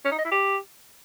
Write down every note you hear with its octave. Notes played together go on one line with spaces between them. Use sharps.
C#4
D#4
D#5
E4
G4